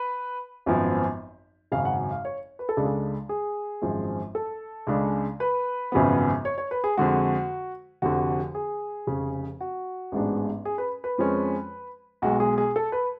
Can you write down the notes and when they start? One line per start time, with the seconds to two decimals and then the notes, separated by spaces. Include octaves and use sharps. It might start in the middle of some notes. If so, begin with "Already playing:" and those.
Already playing: B4
0.66 G#1 F#2 F3 B3
1.72 G#1 F#2 C#3 F#3 F5
1.85 F#5
2.11 F5
2.25 C#5
2.59 B4
2.69 A4
2.77 C#2 C#3 G#3 D4 G#4
2.85 A4
3.29 G#4
3.82 G#1 F#2 F3 G#3
4.35 A4
4.87 C#2 C#3 G#3 D4
5.40 B4
5.92 G#1 F#2 C#3 F3 B3
6.45 C#5
6.58 C#5
6.71 B4
6.84 G#4
6.97 F2 D3 G#3 F#4
8.02 F1 F2 D3 F#4
8.55 G#4
9.07 F1 F2 C#3
9.61 F#4
10.12 A1 G#2 G#3 B3 D4
10.65 G#4
10.78 B4
11.04 B4
11.18 F2 F3 G#3 C#4
12.22 B1 B2 G#3 F#4
12.40 G#4
12.58 G#4
12.76 A4
12.92 B4